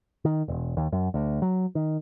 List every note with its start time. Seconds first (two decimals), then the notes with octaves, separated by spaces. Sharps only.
0.25 D#3
0.48 E1
0.77 D#2
0.92 F#2
1.14 D2
1.42 F#3
1.75 D#3